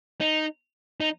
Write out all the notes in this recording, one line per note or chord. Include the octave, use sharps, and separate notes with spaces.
D#4
D#4